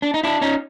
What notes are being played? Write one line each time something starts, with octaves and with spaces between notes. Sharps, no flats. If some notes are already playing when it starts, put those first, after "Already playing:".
D4
D#4
D4 E4
C#4 D#4